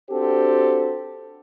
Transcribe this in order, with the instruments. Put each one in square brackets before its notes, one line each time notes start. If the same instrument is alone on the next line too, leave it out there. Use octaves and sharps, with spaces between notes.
[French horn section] C4 D4 F#4 G4 A4 C5